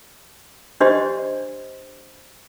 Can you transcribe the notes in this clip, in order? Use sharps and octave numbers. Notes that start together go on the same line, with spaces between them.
D4 G4 C5 D5 D#5 C6